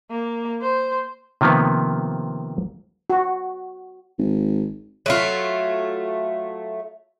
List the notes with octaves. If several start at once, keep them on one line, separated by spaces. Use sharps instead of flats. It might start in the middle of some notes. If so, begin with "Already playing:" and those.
A#3
C5
C3 D#3 F3 A#3 B3
F#4
G#1
F#3 A3 F4